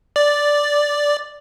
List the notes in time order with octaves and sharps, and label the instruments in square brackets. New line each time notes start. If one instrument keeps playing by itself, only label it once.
[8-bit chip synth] D5